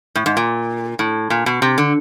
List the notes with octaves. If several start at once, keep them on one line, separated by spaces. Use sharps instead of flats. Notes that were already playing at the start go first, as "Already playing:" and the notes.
A2
G#2
A#2
A2
A#2
B2
C3
D3